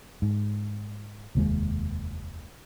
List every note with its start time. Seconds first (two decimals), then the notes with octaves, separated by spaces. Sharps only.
0.22 G#2
1.35 F1 D#2 G#3